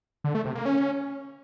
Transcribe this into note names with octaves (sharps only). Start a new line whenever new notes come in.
D3
A3
C3
A#3
C#4